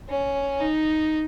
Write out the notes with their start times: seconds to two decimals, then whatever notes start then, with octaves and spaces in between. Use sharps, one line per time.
0.09 C#4
0.61 D#4